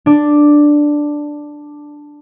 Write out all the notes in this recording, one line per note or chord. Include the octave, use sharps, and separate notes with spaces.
D4 D5